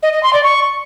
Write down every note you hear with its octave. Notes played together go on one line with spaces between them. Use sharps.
D#5
D#5
C6
D5
C#6